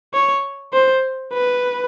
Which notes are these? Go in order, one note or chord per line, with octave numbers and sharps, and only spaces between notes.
C#5
C5
B4